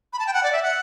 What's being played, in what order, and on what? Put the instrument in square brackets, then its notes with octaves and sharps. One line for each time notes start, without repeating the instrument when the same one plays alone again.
[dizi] B5
A5
G5
F#5
D5
E5
F#5